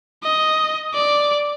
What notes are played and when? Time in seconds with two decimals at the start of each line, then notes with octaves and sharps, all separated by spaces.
0.23 D#5
0.94 D5